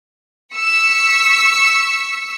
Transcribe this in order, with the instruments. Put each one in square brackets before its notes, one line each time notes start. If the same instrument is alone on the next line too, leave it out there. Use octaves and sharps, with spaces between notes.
[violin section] C#6 E6 B6 C#7